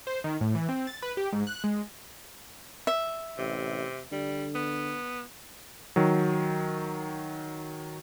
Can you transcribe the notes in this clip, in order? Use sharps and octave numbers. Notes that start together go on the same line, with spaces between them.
C5
D#3
A2
E3
C4
A6
B4
G4
G#2
F#6
G#3
E5
A1 C3
D3 G3
B3
D#3 F#3